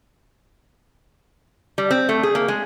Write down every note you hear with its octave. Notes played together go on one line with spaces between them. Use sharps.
G3
C4
A3
G#4
A#3
G#3